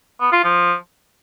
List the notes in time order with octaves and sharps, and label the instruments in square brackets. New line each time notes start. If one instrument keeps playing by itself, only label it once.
[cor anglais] B3
F4
F3